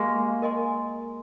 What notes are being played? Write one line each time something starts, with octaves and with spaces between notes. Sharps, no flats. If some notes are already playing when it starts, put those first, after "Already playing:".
Already playing: G#3 A#3 G4 A#4 F5 G#5 C#6
A#4 D#5 G#5 C6